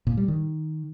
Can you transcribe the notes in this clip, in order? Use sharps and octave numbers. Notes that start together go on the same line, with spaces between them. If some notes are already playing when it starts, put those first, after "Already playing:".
A#2
G3
D#3